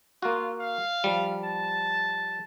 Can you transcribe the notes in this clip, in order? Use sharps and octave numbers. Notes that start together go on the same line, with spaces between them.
A#3 F4 F#4
F5
F3 G3
A5